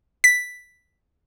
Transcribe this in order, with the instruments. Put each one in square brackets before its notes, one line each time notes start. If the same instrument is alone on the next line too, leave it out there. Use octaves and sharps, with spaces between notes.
[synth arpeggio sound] B6